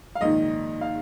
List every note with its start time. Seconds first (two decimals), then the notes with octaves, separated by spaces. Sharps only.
0.15 F5
0.21 A#1 G#2 D#3 D#5
0.81 F5